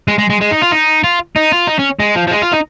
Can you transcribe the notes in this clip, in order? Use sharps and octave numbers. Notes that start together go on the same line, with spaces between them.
G#3
G#3
G#3
G#3
D#4
F4
D#4
F4
D#4
F4
D#4
C#4
G#3
F3
F3
G#3
F4
D#4